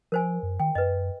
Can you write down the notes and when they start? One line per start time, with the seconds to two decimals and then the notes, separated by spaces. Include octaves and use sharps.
0.12 F3 A#4 C5 G#5
0.43 F#2
0.60 D#3 G5
0.75 F#2 B4 D#5